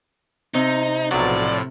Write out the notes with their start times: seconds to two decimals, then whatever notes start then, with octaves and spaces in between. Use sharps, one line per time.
0.54 C3 D#4
1.11 B1 A2 F3 F#3 D5